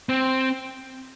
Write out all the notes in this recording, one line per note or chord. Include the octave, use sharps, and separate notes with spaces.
C4